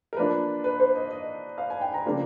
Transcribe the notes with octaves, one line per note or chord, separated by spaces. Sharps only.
A#4
F3 A#3 D4 F4 B4
B4
C5
D#5
D#5
F5
G#5
G5
A#5
C#3 F3 A#3 D4 F4